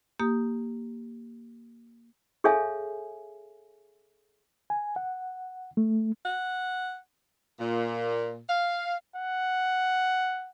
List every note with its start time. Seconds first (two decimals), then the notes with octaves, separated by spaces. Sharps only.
0.20 A#3 G4 D#6
2.44 G#4 A4 C#5 E5 F5 G#5
4.70 G#5
4.96 F#5
5.77 A3
6.25 F#5
7.59 A#2
8.48 F5
9.16 F#5